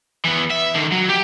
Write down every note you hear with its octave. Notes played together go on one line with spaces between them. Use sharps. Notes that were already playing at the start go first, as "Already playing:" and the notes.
E3 B3
E5
D3 D#3
F#3
G4